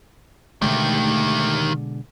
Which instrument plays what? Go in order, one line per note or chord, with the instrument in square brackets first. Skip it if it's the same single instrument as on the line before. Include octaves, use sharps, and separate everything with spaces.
[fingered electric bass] B2 D3 G#3 [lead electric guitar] D#3 G4 [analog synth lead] A3